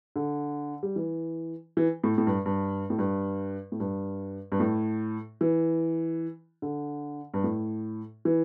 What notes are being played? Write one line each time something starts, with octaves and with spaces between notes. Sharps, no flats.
D3
G3
E3
E3
A2
A2
G2
G2
A2
G2
A2
G2
G2
A2
E3
D3
G2
A2
E3